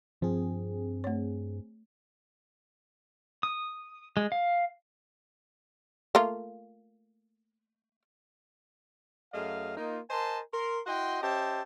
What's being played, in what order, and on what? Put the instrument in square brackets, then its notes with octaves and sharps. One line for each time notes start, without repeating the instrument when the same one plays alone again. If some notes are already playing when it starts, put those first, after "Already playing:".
[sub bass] G2 [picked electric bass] F3 [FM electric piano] C4 G#4
[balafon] A3 C#5
[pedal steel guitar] D#6
G#3
F5
[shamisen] A3 A#3 F4
[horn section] F#2 A3 G#4 D#5 F5
A#3 D#4 F4
A#4 C5 D#5 G#5 A5 C6
A#4 C6
E4 F#4 D#5 F#5 G5 C6
C#4 G4 C5 D#5 E5 A5